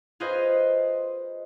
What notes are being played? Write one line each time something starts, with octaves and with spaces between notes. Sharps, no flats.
F4 G#4 B4 C5 D#5